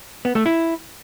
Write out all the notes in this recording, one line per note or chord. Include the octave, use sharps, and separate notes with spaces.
B3
A3
E4